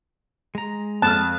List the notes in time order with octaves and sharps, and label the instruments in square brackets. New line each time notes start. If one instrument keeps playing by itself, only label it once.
[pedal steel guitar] G#3 A#5
[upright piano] F2 F6 [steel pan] A5 [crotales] F#6